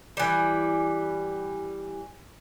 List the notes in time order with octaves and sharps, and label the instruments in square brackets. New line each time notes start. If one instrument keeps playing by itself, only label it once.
[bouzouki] E3 G3